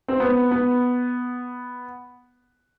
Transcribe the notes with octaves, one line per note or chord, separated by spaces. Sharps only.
C4
B3
B3